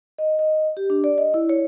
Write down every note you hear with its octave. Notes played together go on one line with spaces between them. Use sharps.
D#5
D#5
G4
D4
D5
D#5
E4
C#5